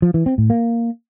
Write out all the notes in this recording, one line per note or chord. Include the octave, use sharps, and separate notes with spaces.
F3
E3
C4
A2
A#3